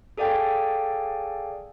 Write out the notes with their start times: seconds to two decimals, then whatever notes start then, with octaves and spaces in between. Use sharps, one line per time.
0.18 G#4 A4 D5 F5 G5 G#5